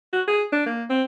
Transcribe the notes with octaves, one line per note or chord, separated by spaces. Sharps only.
F#4
G#4
D4
A#3
C4